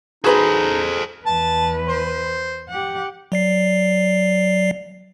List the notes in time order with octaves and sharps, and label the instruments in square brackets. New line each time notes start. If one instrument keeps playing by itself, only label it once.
[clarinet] D#4 [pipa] F#4 B4 B5 [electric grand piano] G#4 [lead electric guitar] A4 C5
[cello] E2 B4 [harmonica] A5
[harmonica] C5
[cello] G4 F#5
[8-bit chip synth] F#3 D5 C7